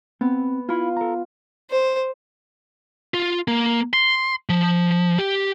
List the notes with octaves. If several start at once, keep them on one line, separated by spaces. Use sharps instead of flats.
B3 C4
E4 F4 B5
A4 A#5
C5
F4
A#3
C6
F3
G4